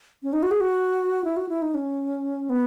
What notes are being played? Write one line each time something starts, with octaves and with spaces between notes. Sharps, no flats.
C#4
D#4
F#4
G#4
F#4
E4
F#4
E4
D#4
C#4
B3